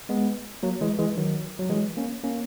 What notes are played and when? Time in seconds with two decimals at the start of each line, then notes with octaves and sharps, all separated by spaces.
0.09 G#3 B3
0.63 F#3 A#3
0.81 E3 G#3
0.99 E3 G#3
1.17 D#3 F#3
1.59 F#3
1.70 E3 G#3
1.97 A#3 C#4
2.23 A#3 C#4